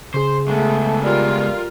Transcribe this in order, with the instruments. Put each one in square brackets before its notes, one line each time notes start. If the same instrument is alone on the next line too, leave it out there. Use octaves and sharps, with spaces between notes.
[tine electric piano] C#3 G#4 [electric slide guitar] C5
[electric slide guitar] G#3 B3 [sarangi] A3
[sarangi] G3 [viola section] F4 A#4